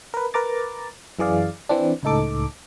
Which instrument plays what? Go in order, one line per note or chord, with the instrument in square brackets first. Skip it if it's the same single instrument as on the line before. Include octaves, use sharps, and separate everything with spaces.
[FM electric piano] A#4 B4
A#4 B4 A#5 D6 A6
F#2 E3 G#4 D5 F5
E3 C4 D4
C#2 A2 D#4 A4 D6